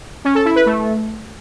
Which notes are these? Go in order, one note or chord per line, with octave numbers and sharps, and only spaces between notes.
C#4
A4
E4
B4
A3